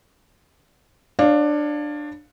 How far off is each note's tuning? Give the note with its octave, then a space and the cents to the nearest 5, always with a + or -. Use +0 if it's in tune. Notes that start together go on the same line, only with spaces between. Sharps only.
D4 +15 C#5 -10 F5 +5